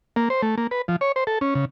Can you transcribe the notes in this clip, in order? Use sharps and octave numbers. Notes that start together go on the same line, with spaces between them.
A#3
C5
A3
A#3
B4
F3
C#5
C5
A4
C#4
C#3